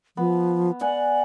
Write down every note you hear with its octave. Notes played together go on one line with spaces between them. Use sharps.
F3 B3
D5 F#5 G#5